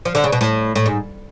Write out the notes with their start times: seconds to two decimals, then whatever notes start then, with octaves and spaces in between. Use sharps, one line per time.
0.05 F3
0.15 D3
0.24 C#3
0.32 B2
0.41 A2
0.76 A2
0.86 G#2